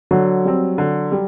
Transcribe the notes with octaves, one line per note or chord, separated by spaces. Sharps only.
D3 F#3
G3 C4
D3
G3